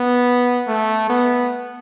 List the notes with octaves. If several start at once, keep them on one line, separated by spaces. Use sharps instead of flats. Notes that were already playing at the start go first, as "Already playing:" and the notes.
Already playing: B3
A3
B3